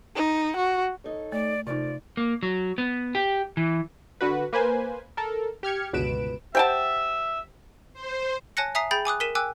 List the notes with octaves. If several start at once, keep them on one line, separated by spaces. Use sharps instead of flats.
D#4
F#4
D#4 A4 C#5
A3 D5
C3 F3 A3 D#4 D5
A#3
F#3
B3
G4
E3
D3 F#4 B4
A#3 B4 C5 G#5
A4 A#4
G4 F6 G#6 C#7
G1 C#2 B2 B4 D7 E7
G4 C5 E5 F#5 G5 A5
C5
C#5 G#5 A5 F#6 A#6 C#7
E5 G#5 A#5 D#6 B6 C7
G#4 G5 B5 G6 A6 F#7
G#5 D6 D#6 F#6
A#4 B6 D#7 E7
G5 G#5 D6 E6 F#6